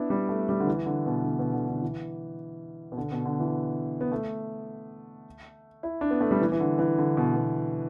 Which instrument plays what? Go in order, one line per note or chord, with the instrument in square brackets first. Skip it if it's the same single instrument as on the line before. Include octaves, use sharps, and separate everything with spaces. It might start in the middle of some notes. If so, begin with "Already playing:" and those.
Already playing: [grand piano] B3 D4 E4
G3
A3
G3
D3
E3
D3
B2
D3
B2
D3
D3
E3
B2
D3
B2
D3
E3
B3
A3
E4
D4
B3
A3
G3
E3
E3
D3
E3
D3
B2
B2